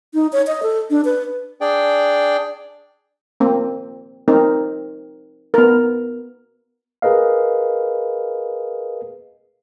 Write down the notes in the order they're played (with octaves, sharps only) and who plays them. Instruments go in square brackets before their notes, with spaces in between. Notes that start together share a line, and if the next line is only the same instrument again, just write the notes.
[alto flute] D#4
C#5
D#5
A4
D4
B4
[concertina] D4 G#4 D5 G5
[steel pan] A#3 C4
C4 D#4 A#4
B3 A#4
[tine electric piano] G#4 A#4 B4 D#5 F5